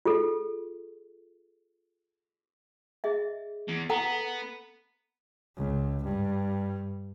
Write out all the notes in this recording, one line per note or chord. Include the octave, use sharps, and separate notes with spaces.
F4 G#4 A4
G#4 D#5 E5
E2
B3 A4 F#5 A#5
C#2
G2